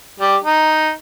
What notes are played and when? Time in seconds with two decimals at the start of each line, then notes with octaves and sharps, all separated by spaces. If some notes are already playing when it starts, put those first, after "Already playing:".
0.20 G3 G4
0.44 D#4